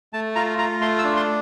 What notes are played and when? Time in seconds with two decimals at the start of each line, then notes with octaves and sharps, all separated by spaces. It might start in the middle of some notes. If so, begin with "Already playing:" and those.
0.13 A3 A5
0.36 F4 A#5
0.58 F4 A#5
0.81 A3 C6
0.99 E6
1.04 D4
1.16 C6